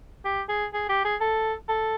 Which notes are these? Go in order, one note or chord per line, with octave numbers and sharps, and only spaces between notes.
G4
G#4
G#4
G4
G#4
A4
A4